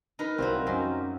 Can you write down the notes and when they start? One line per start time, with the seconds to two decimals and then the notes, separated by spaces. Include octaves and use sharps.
0.19 D#4 A#4 B4
0.38 C2 F#3 C4 F4 F#4 A#4
0.67 F#2 C4 D#4 F#4